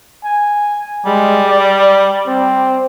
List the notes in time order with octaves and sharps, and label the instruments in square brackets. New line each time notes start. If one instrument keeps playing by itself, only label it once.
[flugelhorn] G#5
[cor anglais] G3 [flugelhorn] G#3
[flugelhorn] D5
C4